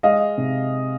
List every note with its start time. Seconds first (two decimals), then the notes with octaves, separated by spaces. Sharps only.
0.03 G#3 D#5 F5
0.38 C3